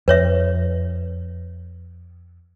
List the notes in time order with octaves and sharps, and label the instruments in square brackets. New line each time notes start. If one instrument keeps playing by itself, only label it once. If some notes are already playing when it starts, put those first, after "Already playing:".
[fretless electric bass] F2 [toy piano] B4 C#5 E5